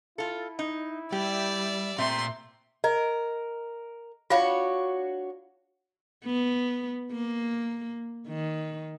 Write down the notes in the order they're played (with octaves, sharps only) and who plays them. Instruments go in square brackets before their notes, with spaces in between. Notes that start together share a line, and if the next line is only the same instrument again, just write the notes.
[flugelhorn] E4 [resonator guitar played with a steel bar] F4 A4
[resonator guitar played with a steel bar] D#4
[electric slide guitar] G3 [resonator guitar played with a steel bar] G4 [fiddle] D5 E5
[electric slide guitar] A#2 A#5 [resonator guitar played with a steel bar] A3 C4 E5 [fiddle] C6
[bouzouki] A#4 [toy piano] D#5
[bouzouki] D4 F#4 C#5 [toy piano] F4 F5 B5
[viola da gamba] B3
A#3
D#3